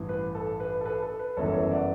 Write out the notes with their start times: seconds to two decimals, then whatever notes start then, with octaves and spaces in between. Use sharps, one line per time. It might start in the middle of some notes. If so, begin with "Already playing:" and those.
Already playing: A1 G2 E3
0.09 B4
0.35 A4
0.60 B4
0.81 A4
0.85 B4
1.02 A4
1.19 B4
1.37 G1 F#2 E3 A4 C#5
1.53 A4 C#5
1.63 E5
1.71 D5 F#5